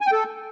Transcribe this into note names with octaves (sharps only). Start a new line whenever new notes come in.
G#5
G5
A4